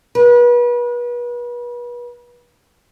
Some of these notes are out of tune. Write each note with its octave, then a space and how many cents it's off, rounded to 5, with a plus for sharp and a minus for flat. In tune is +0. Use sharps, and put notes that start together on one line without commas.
B4 -35